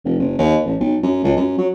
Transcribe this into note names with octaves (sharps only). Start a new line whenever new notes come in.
F1
F#1
D#2
A1
B1
F#2
C#2
F#2
F#3